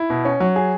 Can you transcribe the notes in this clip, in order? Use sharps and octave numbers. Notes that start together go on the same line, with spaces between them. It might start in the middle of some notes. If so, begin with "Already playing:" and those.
Already playing: E4
B2
C#4
F#3
G#4